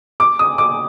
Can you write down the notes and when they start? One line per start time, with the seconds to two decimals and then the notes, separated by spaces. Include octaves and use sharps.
0.20 D6
0.39 D#6
0.58 D6